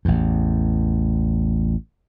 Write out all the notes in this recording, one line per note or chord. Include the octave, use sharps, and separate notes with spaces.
A1 E2